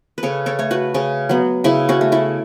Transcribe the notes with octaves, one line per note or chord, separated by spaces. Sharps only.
B4
C#3 A4 C#5
A4 C#5
A3 C#5
F#4 B4
C#3 C#4
F#3 B3
C#3 E4
C#4 F#4
A3
E4 A4